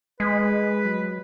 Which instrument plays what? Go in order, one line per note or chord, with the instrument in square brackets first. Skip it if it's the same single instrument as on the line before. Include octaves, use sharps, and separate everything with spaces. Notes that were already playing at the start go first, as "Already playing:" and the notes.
[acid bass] G#3 [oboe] B4
[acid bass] F#3